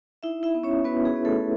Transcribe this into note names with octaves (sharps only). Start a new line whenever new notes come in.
D#4 E4 E5
E4 E5
B3
C#4 C#5
B3 F#4 B4
G#4
B3
A3 A4